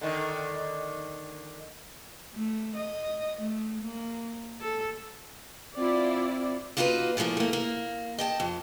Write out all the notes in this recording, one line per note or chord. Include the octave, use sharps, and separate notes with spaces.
D3 D#3
A3
D#5
A3
A#3
A4
C4 E4 F4 D5
A#3 D#4 F4 F#4 G#4 B4
A#2 E3 F3 A3 A#3
A3 A#3
A#3
D#5 G5 A5
F2